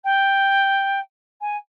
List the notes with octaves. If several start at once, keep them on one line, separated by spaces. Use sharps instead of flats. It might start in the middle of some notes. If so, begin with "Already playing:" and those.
G5
G#5